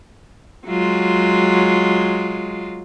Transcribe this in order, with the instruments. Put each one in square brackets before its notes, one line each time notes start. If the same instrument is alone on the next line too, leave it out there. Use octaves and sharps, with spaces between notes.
[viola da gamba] F#3 G#3 F4